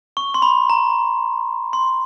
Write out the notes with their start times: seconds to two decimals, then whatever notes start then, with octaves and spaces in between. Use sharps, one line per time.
0.17 C#6
0.34 C6
0.42 B5
0.70 A#5
1.73 C6